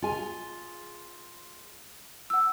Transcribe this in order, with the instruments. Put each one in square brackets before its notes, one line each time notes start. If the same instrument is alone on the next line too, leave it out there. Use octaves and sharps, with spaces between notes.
[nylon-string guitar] F4 G#4 G#5
[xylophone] F#5 E6